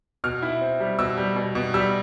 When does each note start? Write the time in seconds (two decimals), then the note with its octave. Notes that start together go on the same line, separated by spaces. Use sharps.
0.24 B2 F6
0.42 E4
0.61 C4
0.80 G3
0.99 B2 E6
1.18 G3
1.36 B2
1.55 B2
1.74 G3 E6